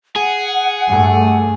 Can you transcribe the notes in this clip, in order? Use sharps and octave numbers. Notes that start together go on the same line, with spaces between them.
G#4 F#5
G2 A3